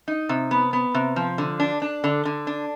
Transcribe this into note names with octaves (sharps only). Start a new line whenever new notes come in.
D#4
C3
B3
B3
C3
F3
D3
D4
D4
D3
D3
D4